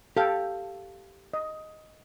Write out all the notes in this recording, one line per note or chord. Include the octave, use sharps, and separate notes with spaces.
G4 A4 F5 G5
D#5